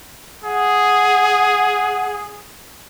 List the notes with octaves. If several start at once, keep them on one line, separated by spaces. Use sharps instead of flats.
G#4 F#5